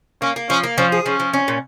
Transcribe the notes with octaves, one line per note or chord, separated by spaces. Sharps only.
A#3 C#4
A#3
F3 C#4
A#3
F3 C#4
G#4
F3 C#4
F3
C#4
A#2